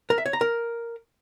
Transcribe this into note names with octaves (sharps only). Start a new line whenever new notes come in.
A#4
E5
C#5
A#5
A#4